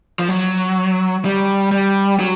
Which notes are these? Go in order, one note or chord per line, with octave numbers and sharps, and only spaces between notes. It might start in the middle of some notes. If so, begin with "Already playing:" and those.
F3
F#3
G3
G3
F#3